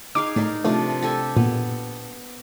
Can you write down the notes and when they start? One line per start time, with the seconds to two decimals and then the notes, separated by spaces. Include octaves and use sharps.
0.15 D#4 G#4 F5 D6
0.36 A2 D#4 A#4 D5
0.65 C3 F3 A3 D4
1.02 G4 A4 G#5
1.36 A#2 B3